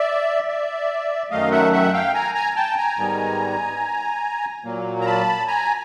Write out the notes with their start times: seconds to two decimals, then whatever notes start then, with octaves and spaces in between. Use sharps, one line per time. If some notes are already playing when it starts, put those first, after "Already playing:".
Already playing: D5 E5
0.48 D5 E5
1.31 F#2 D#3 F#3 A3 D#5 F5
1.52 E5 F#5
1.73 E5 F#5
1.93 F5 G5
2.14 G#5 A#5
2.35 G#5 A#5
2.56 G5 A5
2.77 G#5 A#5
2.97 G#2 D#3 G3 B3
4.64 A#2 F#3 A#3
5.01 A#5
5.06 A5 B5
5.47 G#5 A#5